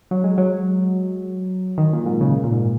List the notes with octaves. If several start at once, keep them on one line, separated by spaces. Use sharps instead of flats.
F#3
G#3
F#3
D#3
A#2
G#2
C#3
A#2
G#2